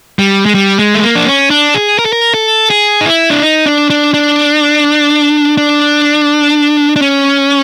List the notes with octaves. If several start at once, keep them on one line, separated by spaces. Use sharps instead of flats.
G3
G#3
G3
G#3
A3
A#3
D4
C#4
D4
G#4
A#4
A4
A#4
A4
G#4
D#4
E4
D4
D#4
D4
D4
D4
D4
D4
C#4